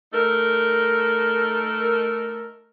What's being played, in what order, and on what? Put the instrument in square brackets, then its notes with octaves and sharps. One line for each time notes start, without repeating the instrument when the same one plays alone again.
[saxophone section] A3 D#4 A4 A#4